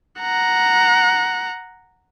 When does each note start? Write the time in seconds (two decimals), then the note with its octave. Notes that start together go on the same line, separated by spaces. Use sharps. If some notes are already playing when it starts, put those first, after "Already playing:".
0.21 F#5 A#5